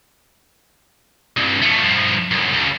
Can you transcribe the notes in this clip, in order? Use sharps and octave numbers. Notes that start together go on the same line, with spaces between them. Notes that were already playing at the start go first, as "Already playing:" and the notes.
C2 G2
F3 A3
G2 F3
C2 F#2
C#2